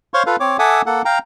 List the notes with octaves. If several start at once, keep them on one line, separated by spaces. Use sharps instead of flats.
C5 C#5 F5 C6 C#6
F4 A4 B4 F5
C4 C#5 D6
A4 E5 F#5 G#5 D6 D#6
A#3 A4 F#5
F5 G5 A#5